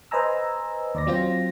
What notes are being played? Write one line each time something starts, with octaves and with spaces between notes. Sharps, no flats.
B4 C5 D#5 G#5 A#5 E6
D#2 D5 A#6
F#3 C4 F4 C5 A#6